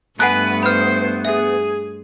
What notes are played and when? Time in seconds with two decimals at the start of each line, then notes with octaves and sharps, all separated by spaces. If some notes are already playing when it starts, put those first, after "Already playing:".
0.20 G2 A3 B3 B4 F#5 G#5 F#6
0.63 C5 B5 F6
1.25 G#4 E5